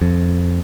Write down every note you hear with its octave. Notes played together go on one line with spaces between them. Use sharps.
F2